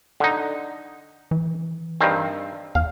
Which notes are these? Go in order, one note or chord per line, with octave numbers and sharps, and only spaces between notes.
D3 D#4
E3
G2 D#3 C4
E2 F5